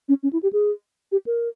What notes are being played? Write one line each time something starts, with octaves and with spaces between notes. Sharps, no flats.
C#4
C#4
E4
G4
G#4
G4
A#4